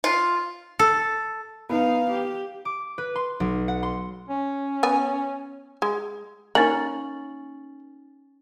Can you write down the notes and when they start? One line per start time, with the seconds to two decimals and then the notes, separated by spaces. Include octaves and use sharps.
0.04 F4
0.79 A4
1.69 B3 D#4 F5
2.11 G4
2.65 D6
2.98 B4
3.16 C6
3.40 B1
3.68 F#5
3.83 C6
4.29 C#4
4.83 B3 G#5
5.82 G#3
6.55 A#3 C#4 D#4 A6 F#7